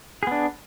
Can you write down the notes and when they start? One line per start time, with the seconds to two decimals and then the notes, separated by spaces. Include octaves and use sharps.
0.23 G#4
0.27 B3
0.31 D4